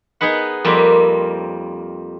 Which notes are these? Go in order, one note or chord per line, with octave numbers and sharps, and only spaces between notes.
B3 D#4 G#4 B4 F#5
F2 G3 A#3 C4 B4